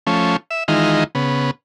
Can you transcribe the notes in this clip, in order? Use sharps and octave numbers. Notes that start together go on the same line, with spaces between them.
F3 A3 C#4
E5
D#3 E3 G#3 D#4 F4
C#3 B3